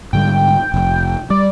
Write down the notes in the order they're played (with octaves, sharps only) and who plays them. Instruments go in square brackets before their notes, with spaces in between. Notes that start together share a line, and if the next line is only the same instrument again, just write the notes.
[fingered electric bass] G#2 D3 G3 [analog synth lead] G5
[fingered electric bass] F1
[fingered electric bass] G3 [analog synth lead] D5